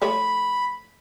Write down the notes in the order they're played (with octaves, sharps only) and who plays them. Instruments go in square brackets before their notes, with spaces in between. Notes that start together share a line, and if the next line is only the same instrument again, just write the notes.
[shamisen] F3 A3 C#5 [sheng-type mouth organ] B5